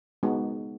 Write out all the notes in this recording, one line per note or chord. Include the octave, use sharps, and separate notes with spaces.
G#3 B3 D#4 F#4